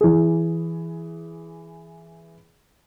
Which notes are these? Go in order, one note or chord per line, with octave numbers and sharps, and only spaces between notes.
E3 G#4